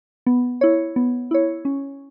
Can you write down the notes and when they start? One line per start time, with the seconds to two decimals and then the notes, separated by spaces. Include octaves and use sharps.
0.27 B3
0.61 E4 C#5
0.96 B3
1.31 E4 C#5
1.65 C#4